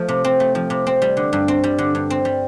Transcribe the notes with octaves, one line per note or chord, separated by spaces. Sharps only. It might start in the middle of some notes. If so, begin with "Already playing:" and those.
Already playing: F3 A3
C3
C4
A3
F3
C3
C4
G3
D3
G2
C4
G3
D3
G2
C4
G3